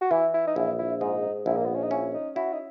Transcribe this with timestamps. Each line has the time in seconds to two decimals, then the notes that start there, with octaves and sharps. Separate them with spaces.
0.01 F#4
0.11 E3 E4
0.34 E4
0.47 D#4
0.56 A#1 E4
0.79 E4
1.00 G#2 D#4
1.46 A#1 E4
1.57 A#3
1.65 B3
1.74 C#4
1.83 D#4
1.91 C#4 E4
2.14 D#4
2.36 E4 F#4
2.53 D#4